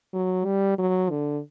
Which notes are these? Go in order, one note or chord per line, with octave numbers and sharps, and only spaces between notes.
F#3
G3
F#3
D3